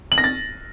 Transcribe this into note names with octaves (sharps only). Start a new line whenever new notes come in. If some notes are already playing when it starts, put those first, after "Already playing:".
F#7
A#6
A6